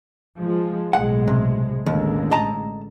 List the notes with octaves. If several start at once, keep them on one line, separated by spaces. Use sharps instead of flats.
F3 G#3
B1 A2 G#3 F#5
C3
A1 D#2 D3 G#3
D#5 A5 A#5